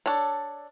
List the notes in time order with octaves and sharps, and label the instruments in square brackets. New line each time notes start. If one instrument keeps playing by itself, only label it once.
[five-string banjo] D4 A4 C#5